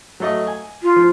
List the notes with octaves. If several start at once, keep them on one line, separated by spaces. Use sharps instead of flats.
F#3 A3 D#5
G#5
F4
F3